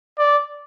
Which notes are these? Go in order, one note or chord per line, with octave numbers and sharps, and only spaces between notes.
D5